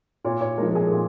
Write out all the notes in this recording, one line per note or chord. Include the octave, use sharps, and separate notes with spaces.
A#2 C#5
C#5
F3 G#3 A#4
A#4
G#4
A#2